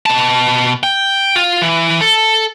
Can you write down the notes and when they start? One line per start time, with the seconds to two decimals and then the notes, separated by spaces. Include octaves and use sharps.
0.06 B2 A5
0.83 G5
1.36 F4
1.62 E3
2.01 A4